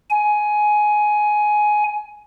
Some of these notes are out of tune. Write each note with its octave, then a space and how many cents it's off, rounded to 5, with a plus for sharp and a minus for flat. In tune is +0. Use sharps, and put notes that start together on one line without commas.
G#5 +15